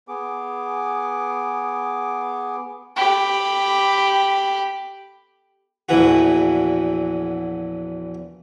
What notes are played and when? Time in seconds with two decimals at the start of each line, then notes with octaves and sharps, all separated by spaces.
0.08 B3 G#4 D6
2.97 G4 B5
5.89 A#1 E2 E3 F#4